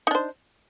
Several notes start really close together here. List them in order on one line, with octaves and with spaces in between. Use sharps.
D#4 D4 C5